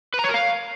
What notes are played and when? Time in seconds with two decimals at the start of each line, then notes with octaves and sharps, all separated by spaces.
0.14 B4
0.19 A#5
0.24 C#5
0.29 A#4
0.34 F5